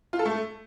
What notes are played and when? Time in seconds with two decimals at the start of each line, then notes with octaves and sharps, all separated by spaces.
0.13 F4
0.19 A4
0.25 A3